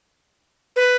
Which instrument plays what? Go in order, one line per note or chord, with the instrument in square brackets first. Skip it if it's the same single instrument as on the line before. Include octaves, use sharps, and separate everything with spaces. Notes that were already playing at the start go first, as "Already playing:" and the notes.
[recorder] B4